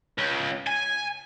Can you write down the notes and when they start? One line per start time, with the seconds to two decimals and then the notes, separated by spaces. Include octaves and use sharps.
0.18 C#2
0.67 G#5